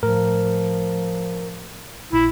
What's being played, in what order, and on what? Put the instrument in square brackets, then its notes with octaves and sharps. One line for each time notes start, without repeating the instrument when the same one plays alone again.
[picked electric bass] A2 [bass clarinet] F3 [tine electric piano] A#4
[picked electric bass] A#1 [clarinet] E4